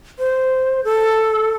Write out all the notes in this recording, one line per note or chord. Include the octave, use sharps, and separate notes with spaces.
C5
A4